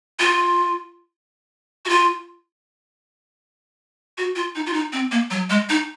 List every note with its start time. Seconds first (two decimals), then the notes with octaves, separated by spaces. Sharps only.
0.19 F4
1.85 F#4
1.89 F4
4.18 F#4
4.36 F4
4.55 D#4
4.66 F4
4.73 D#4
4.93 C4
5.11 A#3
5.31 F#3
5.50 G#3
5.69 D#4